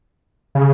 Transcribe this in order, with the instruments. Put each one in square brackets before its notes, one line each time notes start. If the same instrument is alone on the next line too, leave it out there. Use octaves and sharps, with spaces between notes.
[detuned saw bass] C#3